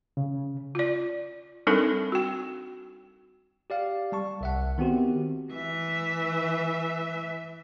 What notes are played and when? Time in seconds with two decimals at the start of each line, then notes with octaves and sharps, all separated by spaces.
0.17 C#3
0.75 F4 D5
1.67 G3 C4 D4 D#4 A4 A#4
2.12 F#4 G5
3.70 G4 D5 F5
4.12 G3 A5 C#6
4.41 C2 E5 F#5
4.78 D#3 B3 C4 F#4 G4
5.52 E3 E5